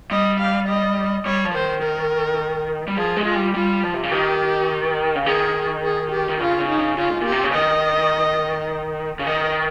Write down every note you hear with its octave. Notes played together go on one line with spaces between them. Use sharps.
G3 D#5
F5
D#5
G3 C#5
F3
D#3 C5
A#4
G3
F3 G#4
G#3
F4
G3
G3 F4
F3
C3
C#3
D#3 G4
C#3
D#3 G#4
G#4
G4
D#3
C#3 F4
C#3
D#4
C#3
C#3 F4
G#2
A#2
G4
C3
C#3
D#3 D#5
C#3
D#3 D#5